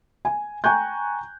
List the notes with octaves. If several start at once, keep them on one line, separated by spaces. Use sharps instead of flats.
G#5
G5 G#5 A#5 C#6 F#6 G6